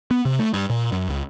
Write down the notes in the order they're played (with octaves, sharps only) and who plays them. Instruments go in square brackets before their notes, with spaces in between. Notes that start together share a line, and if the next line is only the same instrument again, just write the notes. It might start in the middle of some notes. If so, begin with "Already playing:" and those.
[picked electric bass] B3
C3
A3
G2
A#2
F#2
C#2